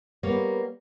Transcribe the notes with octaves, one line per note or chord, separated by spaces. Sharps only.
G3 A#3 B3 C#5